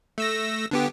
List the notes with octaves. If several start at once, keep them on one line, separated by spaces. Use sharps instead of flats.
A3 E6 A#6
D3 B3 G4